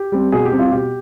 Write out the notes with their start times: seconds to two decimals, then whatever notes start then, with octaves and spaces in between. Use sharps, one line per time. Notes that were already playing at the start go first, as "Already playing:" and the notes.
Already playing: G4
0.12 G3 C4
0.32 B2 G#4
0.45 G4
0.52 G3 C4
0.59 F4
0.72 B2 G4